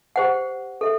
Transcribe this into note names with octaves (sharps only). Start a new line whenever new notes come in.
G4 C5 F#5
A4 E5